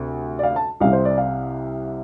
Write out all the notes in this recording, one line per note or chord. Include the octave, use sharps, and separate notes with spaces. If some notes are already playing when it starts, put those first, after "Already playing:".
Already playing: D2 C3
D5
F5
A5
C2 C3 F5
C5
D5
F5